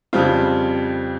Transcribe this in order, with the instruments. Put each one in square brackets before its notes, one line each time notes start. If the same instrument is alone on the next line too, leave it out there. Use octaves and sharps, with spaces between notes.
[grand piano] F2 C#3 G3 C4 F4